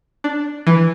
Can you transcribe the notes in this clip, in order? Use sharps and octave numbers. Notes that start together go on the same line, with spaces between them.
D4
E3